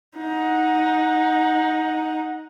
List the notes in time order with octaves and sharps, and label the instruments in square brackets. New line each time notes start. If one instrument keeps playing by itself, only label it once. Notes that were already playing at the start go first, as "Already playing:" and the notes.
[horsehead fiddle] D#4 F#5